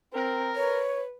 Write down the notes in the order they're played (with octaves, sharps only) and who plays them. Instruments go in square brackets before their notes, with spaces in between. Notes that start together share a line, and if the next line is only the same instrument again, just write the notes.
[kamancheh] C4 [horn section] A#4
[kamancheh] B4 [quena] C#5